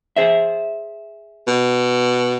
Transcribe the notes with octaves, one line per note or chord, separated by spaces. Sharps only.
G#4 C5 E5
B2